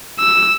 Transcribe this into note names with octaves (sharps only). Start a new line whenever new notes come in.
E6